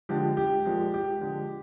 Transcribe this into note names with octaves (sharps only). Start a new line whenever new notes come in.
D3 F3 G#3 G4
G4
A#2 F3 G#3
G4
D3 F3 G#3